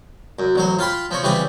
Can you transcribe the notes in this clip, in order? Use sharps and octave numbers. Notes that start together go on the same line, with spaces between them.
F#2
A1 F#3 C5
F4 F5 G5 B5 C6
F3 C4 C#5
C#3 E3 G3 C4 G4 B4